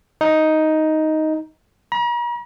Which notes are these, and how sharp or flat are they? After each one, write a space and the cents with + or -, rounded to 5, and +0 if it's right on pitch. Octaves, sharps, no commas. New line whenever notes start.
D#4 +5
A#5 +45